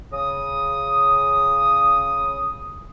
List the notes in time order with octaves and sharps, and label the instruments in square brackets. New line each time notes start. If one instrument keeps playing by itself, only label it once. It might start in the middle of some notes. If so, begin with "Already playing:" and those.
[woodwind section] C#3 D#6